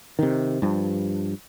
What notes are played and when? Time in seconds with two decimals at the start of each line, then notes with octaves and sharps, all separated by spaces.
0.19 C3 D#3
0.62 G2 F3